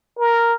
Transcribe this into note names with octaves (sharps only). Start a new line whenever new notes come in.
A#4